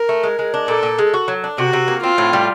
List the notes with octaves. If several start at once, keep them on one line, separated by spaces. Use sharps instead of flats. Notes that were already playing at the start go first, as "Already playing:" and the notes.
Already playing: A#4
A3
G#3
G#3
D4
A#2 A4
A#2
G#3
F#4
F#3
D4
C3 F#4
C3
A#3
C4 F4
A2
G3